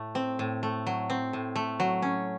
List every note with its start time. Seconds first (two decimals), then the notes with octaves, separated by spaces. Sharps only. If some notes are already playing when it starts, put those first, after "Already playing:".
Already playing: A2 A3
0.15 C4
0.39 A2
0.63 A3
0.86 F#3
1.10 C4
1.33 A2
1.56 A3
1.80 F#3
2.02 C#4